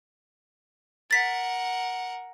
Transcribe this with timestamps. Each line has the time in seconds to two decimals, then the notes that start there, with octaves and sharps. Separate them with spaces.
1.11 A#4 F#5 A6 B6